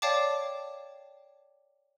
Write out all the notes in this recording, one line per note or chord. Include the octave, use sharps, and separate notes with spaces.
C#5 D5 F5 G5 A5 D6